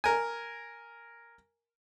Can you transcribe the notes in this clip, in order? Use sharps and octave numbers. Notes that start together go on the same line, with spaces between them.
A#4 G#5